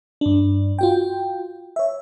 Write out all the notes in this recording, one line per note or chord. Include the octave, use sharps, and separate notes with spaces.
G2 D4
F4 F#4 G5
C#5 E5